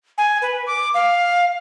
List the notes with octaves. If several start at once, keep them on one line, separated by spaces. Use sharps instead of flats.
G#5
B4
D6
F5